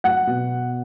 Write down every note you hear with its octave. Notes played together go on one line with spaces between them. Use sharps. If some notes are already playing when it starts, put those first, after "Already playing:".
F#3 F#5
B2